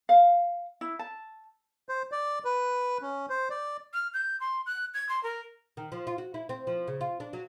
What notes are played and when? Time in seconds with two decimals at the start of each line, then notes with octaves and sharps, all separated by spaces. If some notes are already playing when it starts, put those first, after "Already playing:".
0.09 F5
0.81 E4
0.99 A5
1.89 C5
2.12 D5
2.45 B4
3.02 C#4
3.30 C5
3.50 D5
3.94 F6
4.14 G6
4.40 C6
4.66 F#6
4.94 G#6
5.09 C6
5.23 A#4
5.77 D#3
5.92 F3
6.07 F4
6.18 F#4
6.34 E4
6.49 C4
6.67 F3
6.88 C#3
7.01 F4
7.20 D4
7.33 F#3